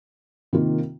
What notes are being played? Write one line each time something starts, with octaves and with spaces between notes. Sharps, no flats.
C3 D#3 A#3 F4